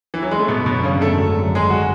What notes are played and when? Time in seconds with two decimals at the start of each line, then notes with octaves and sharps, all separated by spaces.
0.14 E3
0.22 F#3
0.31 G#3
0.39 A3
0.48 G#1 F#2 B2 D3 F#3 B3
0.66 B2 B3
0.84 C#3 C#4
1.01 A3 A4
1.55 G#3 G#4
1.70 F#4